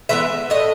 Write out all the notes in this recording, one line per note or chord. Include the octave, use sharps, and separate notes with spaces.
E3 G#3 B3 E5
A2 D#5